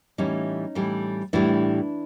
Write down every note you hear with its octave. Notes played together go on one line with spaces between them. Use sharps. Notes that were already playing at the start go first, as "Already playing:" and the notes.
A2 E3 G3 C#4 D#4
A2 E3 G3
A2 E3 G3 D4 E4